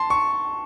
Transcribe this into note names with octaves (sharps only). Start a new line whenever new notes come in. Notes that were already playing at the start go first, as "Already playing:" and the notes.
Already playing: A5 C6
C#6